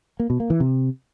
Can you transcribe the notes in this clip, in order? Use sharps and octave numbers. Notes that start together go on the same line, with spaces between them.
A#3
B2
A#3
E3
C3